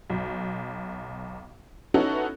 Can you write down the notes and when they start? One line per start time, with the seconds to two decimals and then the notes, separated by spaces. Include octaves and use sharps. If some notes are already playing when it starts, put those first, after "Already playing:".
0.10 B1
1.94 B3 C#4 D#4 E4 F#4 A4